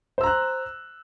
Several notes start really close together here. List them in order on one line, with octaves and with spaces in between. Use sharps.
C5 E6 A#5 F#6